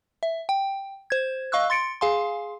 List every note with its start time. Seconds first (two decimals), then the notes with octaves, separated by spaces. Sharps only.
0.23 E5
0.49 G5
1.10 C5 G#6
1.52 D#5 F5 C#6 E6 F#6
1.70 C6 A6 C#7 D7
2.01 G#4 F5 G#5 C6